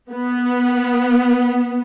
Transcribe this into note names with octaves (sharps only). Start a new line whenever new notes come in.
B3